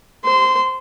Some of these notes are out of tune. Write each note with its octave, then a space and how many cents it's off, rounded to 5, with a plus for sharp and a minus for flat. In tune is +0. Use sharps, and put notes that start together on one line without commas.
C5 +0 C6 -20